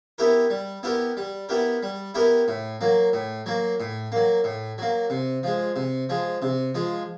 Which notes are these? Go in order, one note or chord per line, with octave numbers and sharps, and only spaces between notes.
B3 E4 G4 A#4
G3
B3 E4 G4 A#4
G3
B3 E4 G4 A#4
G3
B3 E4 G4 A#4
A2
F#3 A#3
A2
F#3 A#3
A2
F#3 A#3
A2
F#3 A#3
C3
F3 G#3
C3
F3 G#3
C3
F3 G#3